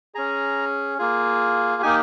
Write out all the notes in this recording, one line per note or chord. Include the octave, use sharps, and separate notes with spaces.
C#4 G#4 A#5
A#3 F4 G#4
A#3 D#4 G4 G#5